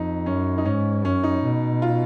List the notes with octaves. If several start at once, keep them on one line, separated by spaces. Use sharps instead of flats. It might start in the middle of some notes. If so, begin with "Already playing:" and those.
Already playing: F2 D#4
F#2 C#4
D#4
G#2 C#4
F#2 C#4
D#4
B2
F4